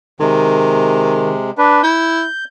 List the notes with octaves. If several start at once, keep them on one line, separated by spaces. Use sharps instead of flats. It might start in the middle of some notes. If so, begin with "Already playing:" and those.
C3 D#3 G#3
D4 B4
E4 G6